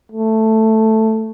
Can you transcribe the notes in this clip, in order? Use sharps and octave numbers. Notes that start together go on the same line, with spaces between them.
A3